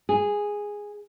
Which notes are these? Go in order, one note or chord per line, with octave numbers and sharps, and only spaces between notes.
G#4